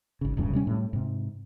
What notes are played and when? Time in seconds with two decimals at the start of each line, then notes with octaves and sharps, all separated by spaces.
0.21 G#1 C#3
0.37 D1 C#2 G2 C#3
0.53 C3 G3 C#4
0.67 A2 G3
0.93 G#2 C3